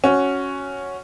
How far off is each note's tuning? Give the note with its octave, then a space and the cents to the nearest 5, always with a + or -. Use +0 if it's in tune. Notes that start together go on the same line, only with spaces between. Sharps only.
C#4 +0 F#4 +0